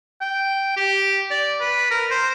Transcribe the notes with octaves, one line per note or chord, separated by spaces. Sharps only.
G5
G4
D5
B4
A#4
C5